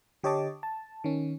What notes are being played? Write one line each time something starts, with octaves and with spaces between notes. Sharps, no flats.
D3 G4 C#5 D#5 A5 D6
A5
D#3 C#4